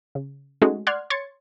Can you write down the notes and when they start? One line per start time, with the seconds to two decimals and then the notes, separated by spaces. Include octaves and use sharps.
0.15 C#3
0.62 G#3 A3 C#4 D#4 F#4 G#4
0.87 D5 F#5 C6 F6 F#6 G#6
1.10 C#5 C6 G#6 A6 C#7